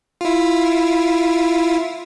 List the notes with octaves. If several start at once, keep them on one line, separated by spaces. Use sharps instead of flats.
E4 F4